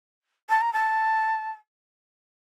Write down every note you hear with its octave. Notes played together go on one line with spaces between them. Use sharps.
A5
A#5
A5